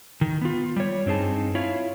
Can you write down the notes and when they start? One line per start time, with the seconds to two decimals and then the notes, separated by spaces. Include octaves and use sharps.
0.21 D#3
0.42 B3 F4
0.76 G3 C#5
1.06 G2 C4 D#4 G#4 A5
1.55 E4 F4 C#5